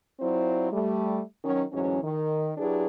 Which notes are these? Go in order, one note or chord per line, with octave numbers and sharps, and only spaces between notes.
F#3 C4 E4 F4 C5 D5
G3 A3
D#3 F#3 C#4
D2 G#2 E3 F#3 C#4
D#3
F#3 D4 E4 G4 G#4 B4